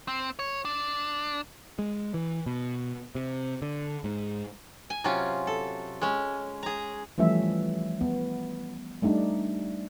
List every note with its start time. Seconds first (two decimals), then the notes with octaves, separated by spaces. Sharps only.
0.08 C4
0.39 C#5
0.65 D4
1.79 G#3
2.14 E3
2.46 B2
3.15 C3
3.62 D3
4.04 G#2
4.90 G#5
5.04 C3 F#3 C#4 F4
5.47 A4
6.02 G#3 C#4
6.63 G#4 A#5
7.18 E3 F3 G3 A3 C#4 E5
8.01 B3
9.02 G3 A3 D4 D#4